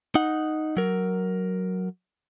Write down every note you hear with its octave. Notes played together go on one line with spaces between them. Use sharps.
D#4 F#5
F#3 A#4